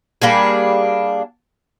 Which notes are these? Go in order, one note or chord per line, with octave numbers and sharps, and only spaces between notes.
G3 A#3 D4 G#4